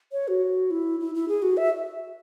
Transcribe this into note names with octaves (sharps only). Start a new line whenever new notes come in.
C#5
F#4
E4
E4
E4
G#4
F#4
E5